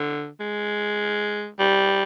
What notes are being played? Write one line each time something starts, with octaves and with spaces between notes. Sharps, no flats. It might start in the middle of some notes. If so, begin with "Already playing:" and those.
Already playing: D3
G#3
G3